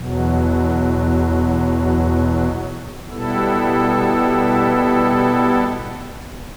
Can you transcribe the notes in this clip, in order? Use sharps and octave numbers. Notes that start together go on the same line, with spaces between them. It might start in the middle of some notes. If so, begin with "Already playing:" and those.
Already playing: E2 B2 F#3
B2 G3 B3 E4 A4